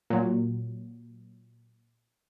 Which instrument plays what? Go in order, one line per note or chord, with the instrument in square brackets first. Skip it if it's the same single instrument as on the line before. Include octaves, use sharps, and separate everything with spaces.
[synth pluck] A#2 F#3